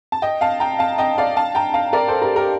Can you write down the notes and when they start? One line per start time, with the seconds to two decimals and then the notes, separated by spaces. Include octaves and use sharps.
0.12 A5
0.22 D#5 G5
0.41 F5 A5
0.60 G5 A#5
0.79 F5 A5
0.98 D#5 G5
1.18 D5 F5
1.36 F5 A5
1.55 G5 A#5
1.74 F5 A5
1.93 A#4 D5
2.08 A4 C5
2.22 G4 A#4
2.36 G4 A#4